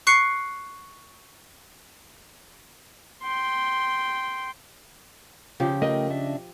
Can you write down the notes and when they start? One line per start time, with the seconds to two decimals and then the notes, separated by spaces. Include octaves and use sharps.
0.07 C#6 F#6 C7 C#7
3.23 G5 C6
5.60 C#3 F3 G4
5.82 A3 A#4 D#5 G5
6.10 D4 E5